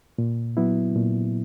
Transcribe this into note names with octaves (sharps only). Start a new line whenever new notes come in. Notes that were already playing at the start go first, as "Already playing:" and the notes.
A#2
F#3 B3 E4
A#2